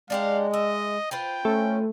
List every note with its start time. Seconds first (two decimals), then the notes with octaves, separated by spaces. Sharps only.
0.10 G#3 D4 G4 F5 F#5
0.54 D#5 E5
1.11 F4 B4 C5 G5
1.45 A3 C#4